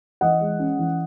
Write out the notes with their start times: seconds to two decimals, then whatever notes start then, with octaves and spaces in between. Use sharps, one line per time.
0.21 E3 D#5 F#5
0.41 G#3
0.59 C#4
0.79 E3